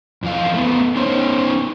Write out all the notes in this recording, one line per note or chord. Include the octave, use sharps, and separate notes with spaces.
F2 E3 F5
A3 B3
B3 C#4 D#4 C5 C#5